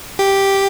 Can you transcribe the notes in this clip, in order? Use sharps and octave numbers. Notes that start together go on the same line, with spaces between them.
G4